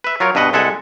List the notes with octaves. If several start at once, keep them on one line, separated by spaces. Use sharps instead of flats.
B4 E5
F#3 F4 A#4 C#5
G2 B2 B4 D#5 F#5
C2 G#3 A4 E5 F#5 G#5